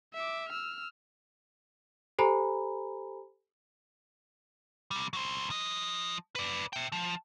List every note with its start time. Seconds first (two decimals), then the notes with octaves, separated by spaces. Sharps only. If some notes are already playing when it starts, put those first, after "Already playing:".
0.14 E5 D6
0.49 E6 F6
2.19 G4 A4 C5 G#5 A#5 B5
4.91 C3 G3
5.13 F#3 C5
5.50 F3 D#5
6.36 B4 D5
6.73 E5 G5
6.92 F3